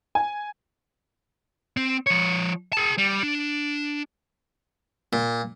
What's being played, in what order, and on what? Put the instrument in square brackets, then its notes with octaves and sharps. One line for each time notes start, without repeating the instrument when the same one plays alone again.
[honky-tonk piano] G#5
[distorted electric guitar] C4
F3 C#5
G#4 A5
G3
D4
[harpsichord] A#2